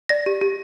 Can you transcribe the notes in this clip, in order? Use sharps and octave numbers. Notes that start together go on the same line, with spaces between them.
D5 A#6
G4
G4